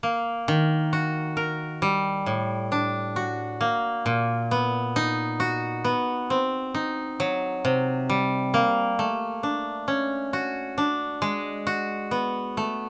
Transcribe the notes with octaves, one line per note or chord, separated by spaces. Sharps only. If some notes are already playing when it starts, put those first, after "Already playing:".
A#3
D#3
F#4
A#4
G3
A2
D4
F#4
A#3
A#2
B3
D#4
F#4
B3
C4
D#4
F#3
C3
G3
A#3
A3
D4
C#4
F#4
D4
G#3
F#4
B3
A3